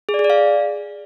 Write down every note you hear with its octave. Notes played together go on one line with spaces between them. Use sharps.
G#4
D5
G#4
D5
F5